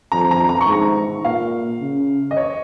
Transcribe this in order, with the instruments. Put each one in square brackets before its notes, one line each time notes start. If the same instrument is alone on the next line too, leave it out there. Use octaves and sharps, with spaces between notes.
[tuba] F2 [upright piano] A#5
[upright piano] A#5
A#5
C#6
[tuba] G#2 [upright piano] A#5
[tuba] A#2 [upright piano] F5
[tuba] C#3
[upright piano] D#5
C#5